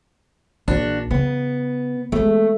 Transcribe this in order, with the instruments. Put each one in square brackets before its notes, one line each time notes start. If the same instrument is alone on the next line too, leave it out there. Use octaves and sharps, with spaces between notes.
[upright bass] A#1 [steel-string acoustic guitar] D4 F#4
[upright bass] C#3 [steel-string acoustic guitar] B3
[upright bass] G#3 B3 [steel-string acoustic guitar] A3